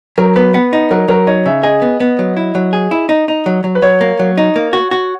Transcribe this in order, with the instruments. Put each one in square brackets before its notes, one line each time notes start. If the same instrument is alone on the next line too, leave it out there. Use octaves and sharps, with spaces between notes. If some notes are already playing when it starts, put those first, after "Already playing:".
[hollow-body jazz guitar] F#3 [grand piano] A#4
[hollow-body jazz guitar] B3 [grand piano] B4
[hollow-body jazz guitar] B3 [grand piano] F#5
[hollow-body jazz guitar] D#4
[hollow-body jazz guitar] F#3 [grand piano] A#4
[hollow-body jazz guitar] F#3 [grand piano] A#4
[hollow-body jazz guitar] D#4 [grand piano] C#5
[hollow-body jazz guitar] C#3 [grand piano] E5
[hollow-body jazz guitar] G#4 [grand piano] D#5
[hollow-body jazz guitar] B3
B3
F#3
E4
F#3
G#4
E4
D#4
D#4
F#3
F#3
[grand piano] B4
[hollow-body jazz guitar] F#3 [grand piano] C#5
[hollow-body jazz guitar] A#3
F#3
D#4
A#3
F#4
F#4